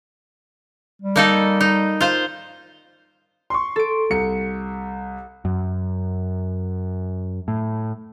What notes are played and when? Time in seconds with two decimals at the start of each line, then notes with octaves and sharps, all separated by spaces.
1.02 G3
1.16 A#3 D#4 A4
1.61 D#4
2.01 F4 C5
3.50 C6 C#6
3.76 A4 D7
4.10 C2 C#7
5.45 F#2
7.48 A2